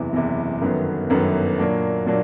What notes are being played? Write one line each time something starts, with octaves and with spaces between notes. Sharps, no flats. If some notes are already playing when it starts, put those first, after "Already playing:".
Already playing: F#1 E2 C3 E3
F#1 E2 C3 E3
G1 F#2 D#3 F#3 B3
G1 F#2 D#3 F#3 B3
A#2 F#3 A#3 D4 F#4
A#2 F#3 A#3 D4